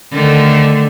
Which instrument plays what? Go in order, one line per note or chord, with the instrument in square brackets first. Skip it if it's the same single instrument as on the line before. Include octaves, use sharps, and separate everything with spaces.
[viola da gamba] D3 D#3 A3